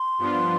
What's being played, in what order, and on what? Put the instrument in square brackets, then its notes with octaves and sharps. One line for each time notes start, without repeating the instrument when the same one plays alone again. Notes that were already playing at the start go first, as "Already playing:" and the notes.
Already playing: [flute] C6
[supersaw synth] G2 F3 B3 D4 F4